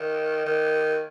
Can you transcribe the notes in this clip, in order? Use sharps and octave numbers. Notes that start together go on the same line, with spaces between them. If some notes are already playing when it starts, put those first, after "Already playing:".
Already playing: D#3
D#3